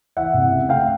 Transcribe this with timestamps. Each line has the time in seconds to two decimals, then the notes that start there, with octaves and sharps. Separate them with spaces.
0.17 E3 E5 F#5
0.34 C3
0.52 C#2
0.69 A3 F5 G5